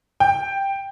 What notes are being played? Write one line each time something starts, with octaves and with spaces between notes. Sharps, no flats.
G5